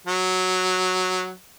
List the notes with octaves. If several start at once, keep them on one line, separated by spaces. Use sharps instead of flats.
F#3